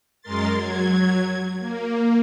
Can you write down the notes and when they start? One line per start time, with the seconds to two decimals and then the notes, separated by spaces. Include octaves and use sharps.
0.21 F#2 G#3 A#4 C6 A6
0.56 F#3 G#6
1.59 A#3